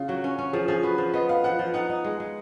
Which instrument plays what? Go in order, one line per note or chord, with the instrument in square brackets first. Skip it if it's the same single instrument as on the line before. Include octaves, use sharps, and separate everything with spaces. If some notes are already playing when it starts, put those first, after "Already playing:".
Already playing: [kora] C#3 [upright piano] F4
[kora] F#3 [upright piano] F#4
[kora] C#4
C#4
[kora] F3 [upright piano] G#4
[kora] F3 [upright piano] G#4
[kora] F#4 [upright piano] B4
[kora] F3
[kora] B3 [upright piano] D#5
[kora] B3 [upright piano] F5
[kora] F3 [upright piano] F#5
[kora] F3
[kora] D#4 [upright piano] F#5
[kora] D#4
G#3
G#3